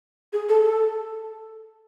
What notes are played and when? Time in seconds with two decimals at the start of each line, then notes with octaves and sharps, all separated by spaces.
0.33 G#4
0.49 A4
0.64 A4